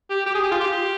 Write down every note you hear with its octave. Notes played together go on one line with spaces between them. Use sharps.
G4
G4
G#4
G4
F4
G4